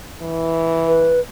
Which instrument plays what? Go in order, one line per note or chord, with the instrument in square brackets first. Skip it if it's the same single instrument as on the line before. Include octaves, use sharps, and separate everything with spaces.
[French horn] E3
[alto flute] B4